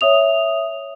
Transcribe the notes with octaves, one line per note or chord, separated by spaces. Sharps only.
C#5 E5 D#6 F7